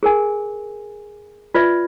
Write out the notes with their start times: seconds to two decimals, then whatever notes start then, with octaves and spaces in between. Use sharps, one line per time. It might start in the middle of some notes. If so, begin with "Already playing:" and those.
0.03 G#4 A#4 G#5
1.54 F4 B4 D5 E5